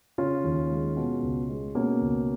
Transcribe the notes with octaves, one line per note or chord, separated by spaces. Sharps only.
C#3 C#4 F4
D#2
G#3
B2
C#2
G#3
B2 A#3 C#4
C#2